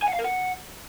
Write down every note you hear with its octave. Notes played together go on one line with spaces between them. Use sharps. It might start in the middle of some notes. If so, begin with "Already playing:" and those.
G#5
F#5
F5
A#4
F#5